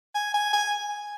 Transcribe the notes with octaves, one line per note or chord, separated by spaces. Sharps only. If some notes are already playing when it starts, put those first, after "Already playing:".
G#5
G#5
G#5